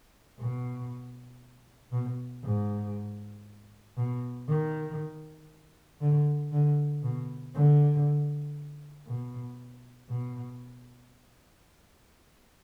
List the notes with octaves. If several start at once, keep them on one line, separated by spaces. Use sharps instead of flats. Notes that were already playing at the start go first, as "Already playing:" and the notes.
B2
B2
G#2
B2
D#3
D3
D3
B2
D3
B2
B2